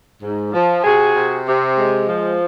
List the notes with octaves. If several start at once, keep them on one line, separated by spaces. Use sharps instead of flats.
G#2
F3
C3 F#4 G#4
C3
C3
G#3
F3